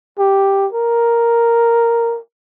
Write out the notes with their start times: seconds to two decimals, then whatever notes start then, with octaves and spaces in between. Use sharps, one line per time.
0.19 G4
0.73 A#4